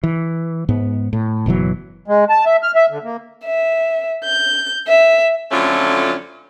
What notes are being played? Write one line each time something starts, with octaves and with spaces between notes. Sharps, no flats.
E3
G#2 B3
A2
F#1 B2 E3 F#3
G#3
A5
E5
F6
E5
D3
A#3
E5
G6
E5
F2 D3 F#3 A3 C#4 F4